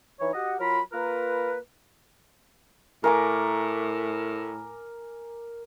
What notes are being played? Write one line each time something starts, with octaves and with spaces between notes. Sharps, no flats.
E3 D#4 C#5
F#4 G4 D#5 F#5
F#3 F4 A#4 B5
A#3 F4 A#4 B4
A2 A#4 G#5 D6